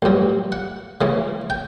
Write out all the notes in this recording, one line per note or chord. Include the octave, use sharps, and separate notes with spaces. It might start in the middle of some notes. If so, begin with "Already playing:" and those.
A1 G2 F#3
F#5
C#2 C#3 E3
G5